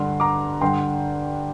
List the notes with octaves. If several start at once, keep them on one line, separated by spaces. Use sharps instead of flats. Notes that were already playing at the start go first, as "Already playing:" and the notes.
Already playing: G2 D3 C6
A#5 D6
G2 D3 G5 C6